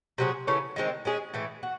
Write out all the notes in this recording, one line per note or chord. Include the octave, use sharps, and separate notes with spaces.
C3 F#3 C#4 G#4
C#3 E3 A3 C#4
D#3 G#3 C4
G#3 C#4 G#4
A2 E3 A3
F#4